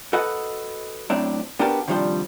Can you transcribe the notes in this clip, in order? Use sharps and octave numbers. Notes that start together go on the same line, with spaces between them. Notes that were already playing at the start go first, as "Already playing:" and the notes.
F#4 A4 B4 D#5 F#5
F#2 A2 C4 D4
B3 D4 F#4 G4 A#4 A5
C3 D#3 F3 G3 D4 C5